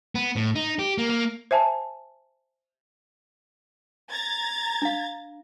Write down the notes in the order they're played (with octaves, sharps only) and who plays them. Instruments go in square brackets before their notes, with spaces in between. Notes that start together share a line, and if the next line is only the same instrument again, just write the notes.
[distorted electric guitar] B3
A2
D#4
G4
A#3
A#3
[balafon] C5 E5 G#5 A5
[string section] A#5 G#6 A6
[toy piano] D4 F5